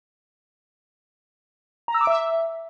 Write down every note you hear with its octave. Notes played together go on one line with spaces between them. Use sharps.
A#5
E6
D6
E5